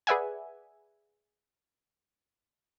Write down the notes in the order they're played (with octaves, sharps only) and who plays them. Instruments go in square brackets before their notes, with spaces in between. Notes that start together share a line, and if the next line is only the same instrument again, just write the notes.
[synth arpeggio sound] G#4 B4 D5 E5 F#5 G#5